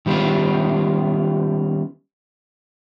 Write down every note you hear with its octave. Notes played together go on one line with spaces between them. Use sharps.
D#3 G3 A3 B3 C#4 F4